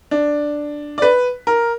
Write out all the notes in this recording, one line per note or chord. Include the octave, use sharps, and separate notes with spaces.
D4
D5
B4
A#4